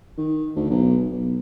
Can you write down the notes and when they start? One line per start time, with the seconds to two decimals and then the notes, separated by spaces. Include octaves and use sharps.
0.17 D#3
0.55 D2
0.70 B1
1.11 B1